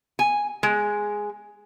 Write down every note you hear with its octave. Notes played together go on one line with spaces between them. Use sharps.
G#5
G#3